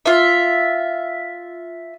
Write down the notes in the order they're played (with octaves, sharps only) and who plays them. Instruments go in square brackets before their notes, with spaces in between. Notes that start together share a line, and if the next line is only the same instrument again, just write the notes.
[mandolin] F4 E5